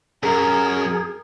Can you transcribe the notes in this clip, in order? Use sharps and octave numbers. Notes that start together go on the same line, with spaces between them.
F#2 G#4 A#4